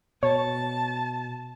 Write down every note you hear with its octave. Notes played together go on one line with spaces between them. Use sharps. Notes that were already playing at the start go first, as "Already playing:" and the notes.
B2 C#5 A5